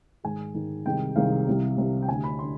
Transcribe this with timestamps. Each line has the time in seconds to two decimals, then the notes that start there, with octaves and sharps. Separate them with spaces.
0.24 G#2 D#3 G#3 G#5
0.54 G#2 D#3 G#3
0.85 C2 C3 D#3 G#3 G5
1.16 C2 C3 D#3 G#3 F5
1.47 C2 C3 G3
1.78 C2 C3 G3
2.02 G5
2.09 D2 D3 G3 G#5
2.24 B5
2.39 D3 C6